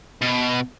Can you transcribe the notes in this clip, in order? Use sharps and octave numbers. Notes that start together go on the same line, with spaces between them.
B2